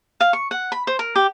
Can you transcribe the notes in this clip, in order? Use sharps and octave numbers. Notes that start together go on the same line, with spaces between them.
F5
C#6
F#5
B5
C5
A#4
G4